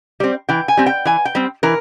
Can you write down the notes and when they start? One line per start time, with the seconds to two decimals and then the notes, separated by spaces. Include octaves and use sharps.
0.20 G3 C4
0.49 E3 G5
0.68 G#5
0.77 G3 C4
0.86 G5
1.05 E3 G#5
1.25 G5
1.35 G3 C4
1.63 E3 A#4